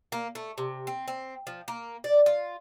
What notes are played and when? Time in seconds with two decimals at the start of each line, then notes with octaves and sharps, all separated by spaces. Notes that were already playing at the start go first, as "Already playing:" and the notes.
0.12 A#3
0.35 A3
0.58 C3
0.87 C4
1.08 C4
1.47 F3
1.68 A#3
2.04 D5
2.26 F4